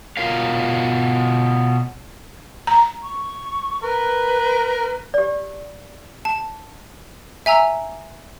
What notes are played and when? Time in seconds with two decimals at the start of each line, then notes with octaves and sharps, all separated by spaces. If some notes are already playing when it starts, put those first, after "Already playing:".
0.17 B2 F4 A#4 C#5 F5
2.67 A#5
3.03 C#6
3.83 A#4 B4
5.14 G4 D5
6.25 A5
7.46 E5 G#5 A#5 E6